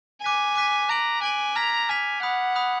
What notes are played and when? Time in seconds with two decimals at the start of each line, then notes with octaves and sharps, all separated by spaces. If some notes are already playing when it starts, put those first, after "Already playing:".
0.22 G#5 D6 F#6 B6 D#7
0.56 D6 F#6 B6 D#7
0.89 A#5 F#6 D7 F#7
1.22 G#5 F#6 D7 F#7
1.55 A#5 F6 G#6 B6 F7
1.89 G#5 F6 G#6 B6 F7
2.22 F#5 B5 D#6 F#6
2.56 B5 D#6 F#6